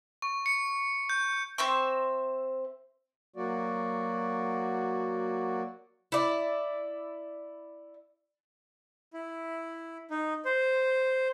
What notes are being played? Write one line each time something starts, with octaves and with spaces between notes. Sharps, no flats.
C#6
C#7
G6
C4 C5 E5 C#6
F#3 A#3 F#4 D5
E4 D5
E4
D#4
C5